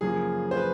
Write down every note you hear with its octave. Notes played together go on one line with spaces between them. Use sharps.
F#2 C#3 F3 A#3 G#4
C5
B4